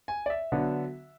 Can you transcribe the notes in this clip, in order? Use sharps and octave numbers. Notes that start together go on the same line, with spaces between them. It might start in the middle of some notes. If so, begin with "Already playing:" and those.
G#5
D5
E5
D3 F#3 B3 D4